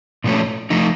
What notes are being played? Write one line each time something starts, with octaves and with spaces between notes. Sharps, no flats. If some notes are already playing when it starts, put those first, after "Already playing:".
A#2 F3 A3 C#4
F3 A3 D#4